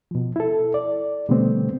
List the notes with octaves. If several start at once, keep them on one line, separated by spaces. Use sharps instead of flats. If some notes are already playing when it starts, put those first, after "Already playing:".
B2 F3
E4 A4
D5
B2 D3 G3 A3 B3 C4